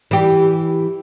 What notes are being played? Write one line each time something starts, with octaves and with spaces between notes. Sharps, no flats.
E3 G4